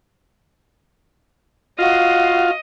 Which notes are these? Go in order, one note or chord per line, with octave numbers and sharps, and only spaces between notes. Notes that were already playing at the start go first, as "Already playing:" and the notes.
F4 F#4 D#5 F5